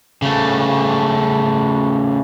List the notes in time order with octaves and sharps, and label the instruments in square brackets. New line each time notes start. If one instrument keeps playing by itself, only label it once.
[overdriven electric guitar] C#3 A3